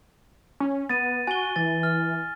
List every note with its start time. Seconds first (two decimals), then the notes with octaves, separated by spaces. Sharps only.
0.60 C#4
0.89 B3 A6 D#7
1.27 F#4 G#5 G7
1.56 E3 A6
1.83 F6